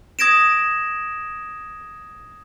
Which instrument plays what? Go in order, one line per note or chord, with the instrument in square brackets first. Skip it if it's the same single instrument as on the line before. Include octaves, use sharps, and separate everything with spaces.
[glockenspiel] D#6 G#6 A#6 D7 E7